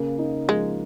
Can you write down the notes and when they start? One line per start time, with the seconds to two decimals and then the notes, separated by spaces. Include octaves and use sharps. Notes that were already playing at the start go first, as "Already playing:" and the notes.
Already playing: C#3 A#3
0.18 D#4
0.48 F3 G#3